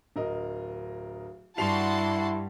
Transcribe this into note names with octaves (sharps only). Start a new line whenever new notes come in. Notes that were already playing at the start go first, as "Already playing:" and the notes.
D1 A#4 D#5
G2 G3 E4 F#4 A5 C6 C7 F7